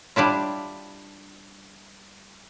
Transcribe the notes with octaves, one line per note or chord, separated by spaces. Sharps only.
G3 D4 E4 F4